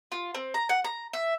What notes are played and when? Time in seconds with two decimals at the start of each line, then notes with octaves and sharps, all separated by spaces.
0.12 F4
0.35 C4
0.54 A#5
0.69 F#5
0.84 A#5
1.13 E5